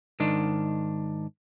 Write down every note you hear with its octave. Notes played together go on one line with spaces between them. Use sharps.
G#2 D#3 D4